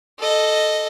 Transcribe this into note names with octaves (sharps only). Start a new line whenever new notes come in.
A4 D#5